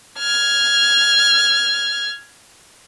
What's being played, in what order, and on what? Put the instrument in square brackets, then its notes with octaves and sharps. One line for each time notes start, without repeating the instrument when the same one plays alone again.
[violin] F6 G#6